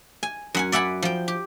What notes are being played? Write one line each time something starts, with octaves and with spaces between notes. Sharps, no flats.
G#5
F#2 F#5 G#5
D5 E5 F#5 G#5 B5
F3 G5
G4